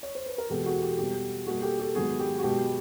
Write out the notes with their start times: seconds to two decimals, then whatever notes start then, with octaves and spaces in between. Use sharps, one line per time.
0.03 C#5
0.15 C5
0.26 B4
0.38 A#4
0.50 E2 B2 G#3 B3 G4 A4
0.66 F#4 G#4
0.82 G4
0.98 B2 G3 B3 G4
1.46 B2 G3 A#3 F#4 G#4
1.63 G4 A4
1.79 G4 A4
1.95 G#2 D#3 F#3 B3 F#4 G#4
2.19 G4
2.38 F#4
2.43 B2 G#3 B3 G4